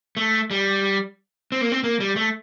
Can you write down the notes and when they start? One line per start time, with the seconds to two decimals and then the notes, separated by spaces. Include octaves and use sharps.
0.17 A3
0.51 G3
1.52 C4
1.61 A#3
1.72 C4
1.84 A#3
2.00 G3
2.16 A3